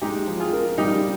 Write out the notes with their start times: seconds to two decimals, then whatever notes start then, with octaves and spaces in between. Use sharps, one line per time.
0.02 G#3 D#4 G4
0.27 F3
0.40 F4 G#4
0.53 A#4
0.78 G3 D#4 G4